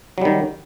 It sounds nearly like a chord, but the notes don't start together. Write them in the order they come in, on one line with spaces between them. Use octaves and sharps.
F#3 G3 D#3